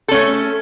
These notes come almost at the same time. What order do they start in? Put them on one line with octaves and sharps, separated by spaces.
A4 C#4 A3